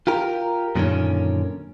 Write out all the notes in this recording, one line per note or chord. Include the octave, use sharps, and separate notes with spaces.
F4 G4 A#4
F#2 A#2 D3 D#3 C#4